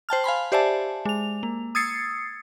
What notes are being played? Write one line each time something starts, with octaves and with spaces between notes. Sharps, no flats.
C5 G5 A5 F6
F5 G#5 B5 C6
G4 C5 D5 E5 G#5 A5
G#3 F7
A#3
D#6 E6 G#6 A6 C7 C#7